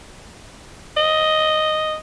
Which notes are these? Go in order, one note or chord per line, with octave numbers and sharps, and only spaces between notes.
D#5